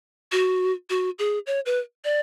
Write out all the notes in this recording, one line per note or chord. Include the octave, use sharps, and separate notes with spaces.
F#4
F#4
G#4
C#5
B4
D5